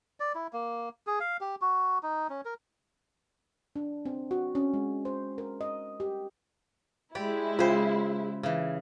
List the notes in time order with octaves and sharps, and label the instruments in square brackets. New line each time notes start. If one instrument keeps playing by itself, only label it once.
[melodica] D5
E4
A#3
G#4
F5
G4
F#4
D#4
C#4
A#4
[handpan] D4
C4
F#4
C#4
G#3
C5
A#4
D#5
G4
[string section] G#3 E4 [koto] G4 D5
[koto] C#3 C5 [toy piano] F4 G5
[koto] C#3 E3